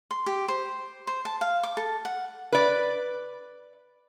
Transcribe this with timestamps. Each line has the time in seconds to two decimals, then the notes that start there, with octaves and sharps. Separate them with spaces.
0.11 C6
0.26 G4
0.48 C5
1.07 C5
1.25 A5
1.41 F5
1.63 D6
1.77 A4
2.05 F#5
2.52 B4 D5